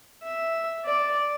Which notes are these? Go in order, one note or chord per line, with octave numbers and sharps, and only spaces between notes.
E5
D5